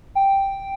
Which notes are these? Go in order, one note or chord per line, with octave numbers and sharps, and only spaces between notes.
G5